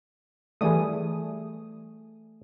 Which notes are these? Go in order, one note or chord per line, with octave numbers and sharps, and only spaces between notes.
E3 G3 A3 G#4 D#6